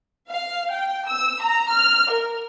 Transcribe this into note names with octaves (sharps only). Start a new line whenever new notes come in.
F5
G5
E6
A#5
F6
A#4